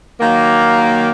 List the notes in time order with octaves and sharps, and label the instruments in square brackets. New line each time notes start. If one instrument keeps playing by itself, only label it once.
[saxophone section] D#3 F#3 A#3